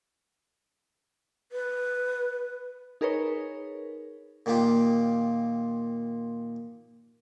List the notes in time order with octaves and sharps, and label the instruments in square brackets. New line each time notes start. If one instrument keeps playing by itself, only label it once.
[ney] B4
[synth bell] D#4 G#4 A#4 B4 C#5
[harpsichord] A#2 D#3 A#3 F4 G4